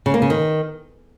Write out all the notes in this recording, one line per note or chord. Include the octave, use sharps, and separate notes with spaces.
C#3
A#3
C#3
D#3